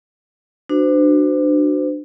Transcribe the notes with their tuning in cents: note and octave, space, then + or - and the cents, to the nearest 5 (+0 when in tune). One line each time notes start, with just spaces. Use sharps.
D4 +25 F#4 +0 C5 -40